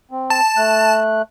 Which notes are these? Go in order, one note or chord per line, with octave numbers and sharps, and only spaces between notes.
C4
A5
A3 F#6